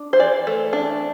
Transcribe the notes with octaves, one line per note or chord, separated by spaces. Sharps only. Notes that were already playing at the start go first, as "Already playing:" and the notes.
Already playing: D4
C5
E3 D5
A3
D4